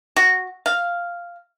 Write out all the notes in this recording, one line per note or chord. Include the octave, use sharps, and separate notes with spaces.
F#4
F5